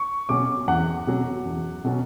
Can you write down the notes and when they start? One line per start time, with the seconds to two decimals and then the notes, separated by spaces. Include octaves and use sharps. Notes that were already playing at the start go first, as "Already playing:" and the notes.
Already playing: C#6
0.29 B2 F#3 C#4 D6
0.68 E2 F#5
1.07 B2 F#3 C#4
1.45 E2
1.84 B2 F#3 C#4